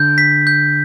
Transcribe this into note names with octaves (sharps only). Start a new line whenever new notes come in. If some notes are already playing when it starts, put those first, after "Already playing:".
Already playing: D3 G6
B6
G6